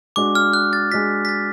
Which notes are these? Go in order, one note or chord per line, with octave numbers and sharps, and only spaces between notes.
G#3 D4 F#4 D6
F6
F#6
A6
G#3 D4 F#4 B6
B6
A6